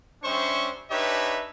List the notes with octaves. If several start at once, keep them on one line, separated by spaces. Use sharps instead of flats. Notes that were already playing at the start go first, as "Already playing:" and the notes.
G3 C#4 D4 C5 E5 C#6
D4 D#4 G4 B4 C#5 E5